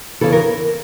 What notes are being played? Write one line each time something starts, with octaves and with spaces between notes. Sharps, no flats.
E2 C#3 E3 A4
A#4